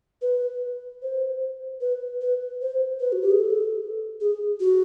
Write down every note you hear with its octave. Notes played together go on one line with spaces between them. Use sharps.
B4
C5
B4
B4
C5
B4
F#4
G4
G#4
A4
G#4
F#4